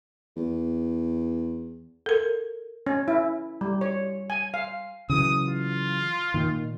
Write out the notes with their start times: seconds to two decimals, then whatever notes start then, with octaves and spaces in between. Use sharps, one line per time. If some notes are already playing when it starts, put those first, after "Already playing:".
0.36 E2
2.06 A4 A#4
2.87 C#4
3.08 E4
3.61 G3
3.81 C#5
4.30 G#5
4.54 F5
5.10 C#3 E3 F#3 D#6
5.48 F4
6.34 A#2 D#3